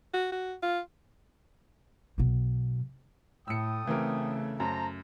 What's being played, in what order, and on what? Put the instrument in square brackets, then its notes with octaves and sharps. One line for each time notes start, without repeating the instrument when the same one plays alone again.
[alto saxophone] F#4
F#4
F4
[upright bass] B1 B2
[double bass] A2 [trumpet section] A4 G5 D#6 [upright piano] E6 C#7
[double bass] C#3 A3 [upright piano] E3 C4 A#4
[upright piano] F#2 [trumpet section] C5 A5 A#5